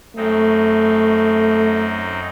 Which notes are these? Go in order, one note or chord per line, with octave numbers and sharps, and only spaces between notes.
F#2 A3 C4 D#4